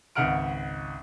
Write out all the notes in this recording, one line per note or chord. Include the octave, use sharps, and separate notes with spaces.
G#1 C#2 E5 F#5 F6 D7